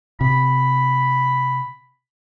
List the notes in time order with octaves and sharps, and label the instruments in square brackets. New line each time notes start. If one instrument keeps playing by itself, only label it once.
[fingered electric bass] C3 [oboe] B5